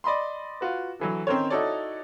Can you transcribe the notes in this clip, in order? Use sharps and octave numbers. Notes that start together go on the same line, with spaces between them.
D5 D#5 B5 C6
F4 F#4 B4
D3 E3 F#3
D#3 C4 C#4 A#4 C5 C#5
D#4 E4 F#4 A4 C#5 D5